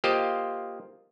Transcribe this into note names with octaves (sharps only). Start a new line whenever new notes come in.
A#3 F4 G4 C5 D#5